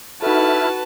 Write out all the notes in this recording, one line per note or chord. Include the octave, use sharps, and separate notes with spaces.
D#4 E4 F#4 A4 B4 E5 A5 F6